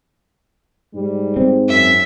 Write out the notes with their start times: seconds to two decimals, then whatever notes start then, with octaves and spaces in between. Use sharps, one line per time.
0.94 G#2 G3
1.37 C4
1.68 F#2 E5